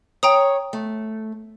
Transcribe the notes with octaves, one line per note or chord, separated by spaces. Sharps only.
C#5 G5 A#5 D#6
A3